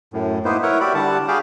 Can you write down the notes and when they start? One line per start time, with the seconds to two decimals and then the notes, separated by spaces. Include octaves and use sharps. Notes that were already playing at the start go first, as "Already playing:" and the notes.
0.13 F#2 A2
0.45 A#3 B3 D#4 E4 B4 C5
0.63 E4 A#4 B4 C#5 E5 F#5
0.81 F#4 G4 D5 E5 B5
0.95 D3 G3 F#5 A5
1.28 F#4 G#4 F5 G5 B5 D6